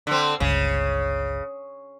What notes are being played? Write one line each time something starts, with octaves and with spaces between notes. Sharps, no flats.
D3 C4
G1 C#2 C#3